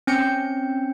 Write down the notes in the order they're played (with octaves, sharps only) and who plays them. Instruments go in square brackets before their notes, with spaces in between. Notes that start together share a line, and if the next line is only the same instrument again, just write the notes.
[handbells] C4 C#4 G6 C#7